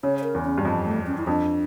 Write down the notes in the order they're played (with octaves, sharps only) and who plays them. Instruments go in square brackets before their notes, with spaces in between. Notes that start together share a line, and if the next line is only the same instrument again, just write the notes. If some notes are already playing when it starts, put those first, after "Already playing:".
[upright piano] C#3 [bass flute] C#5
[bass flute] C#5
A#4
[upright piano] E2
[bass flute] C#4
[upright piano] G2
[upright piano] F2 [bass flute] G3
[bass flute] A3
C#4
E4
[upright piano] F2 [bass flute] D4